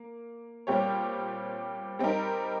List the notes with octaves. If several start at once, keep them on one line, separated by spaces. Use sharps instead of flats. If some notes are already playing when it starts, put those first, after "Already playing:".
Already playing: A#3
A#2 G3 C4 G4 C#5
G3 C4 D#4 G4 A#4